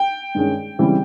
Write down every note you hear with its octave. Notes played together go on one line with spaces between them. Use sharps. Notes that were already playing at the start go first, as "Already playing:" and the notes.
Already playing: G5
G2 D#3 G#3 C#4
C#3 E3 G3 C4